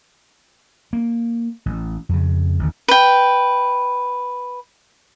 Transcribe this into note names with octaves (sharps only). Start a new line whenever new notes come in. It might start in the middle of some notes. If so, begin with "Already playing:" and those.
A#3
A1
F2 C#3
A1 D#2 D3
B4 G5